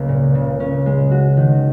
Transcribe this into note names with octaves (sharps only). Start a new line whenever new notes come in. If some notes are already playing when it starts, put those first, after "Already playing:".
Already playing: C#2 A#3
A#2
C#3
C#4
G#3
F#4
D#3